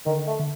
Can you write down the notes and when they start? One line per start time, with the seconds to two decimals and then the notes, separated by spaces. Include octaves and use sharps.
0.06 D3 D#3
0.27 A3
0.39 D3